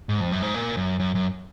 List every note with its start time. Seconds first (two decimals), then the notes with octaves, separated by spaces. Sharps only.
0.09 G#2
0.20 F2
0.32 F#2
0.42 G#2
0.54 A#2
0.77 F#2
1.00 F#2
1.15 F#2